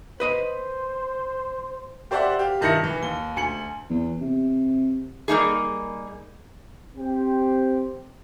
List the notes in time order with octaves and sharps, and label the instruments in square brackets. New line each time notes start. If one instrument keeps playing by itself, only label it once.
[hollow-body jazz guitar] B4 D#5 B5 [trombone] C5
[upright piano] G4 C5 D5 E5 F#5
G4 F5
G2 D#3 E4 A#6 C#7
E3
D#2 G7
D2 G#5 C#7 F#7
[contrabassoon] E2
C3
[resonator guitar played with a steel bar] G3 A#3 D#4 G#4
[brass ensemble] C4 G4 C5